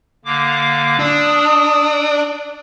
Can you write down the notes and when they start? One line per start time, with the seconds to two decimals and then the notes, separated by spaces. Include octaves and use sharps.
0.25 D3 A#3 D6
0.99 D4 D#6 E6